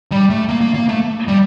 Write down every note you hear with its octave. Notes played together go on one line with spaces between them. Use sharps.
G3
A3
A#3
A#3
A#3
A3
G3